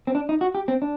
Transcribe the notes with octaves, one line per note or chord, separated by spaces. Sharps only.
C4
D4
D#4
F#4
G4
C4
D4